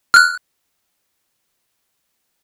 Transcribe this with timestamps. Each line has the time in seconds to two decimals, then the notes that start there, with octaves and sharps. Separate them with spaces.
0.14 F6 F#6